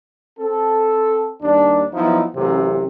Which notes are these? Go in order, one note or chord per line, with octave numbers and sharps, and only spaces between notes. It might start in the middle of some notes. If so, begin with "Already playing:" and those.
C4 A4
D#2 G3 D4
F3 F#3 B3 D#4 E4
A1 F#2 C3